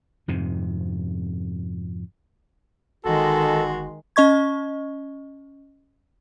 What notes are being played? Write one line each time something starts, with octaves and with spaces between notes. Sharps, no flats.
F2 G#2 C3
G1 D#3 G#3 F#4 A4 C6
C#4 D#5 C#6 G#6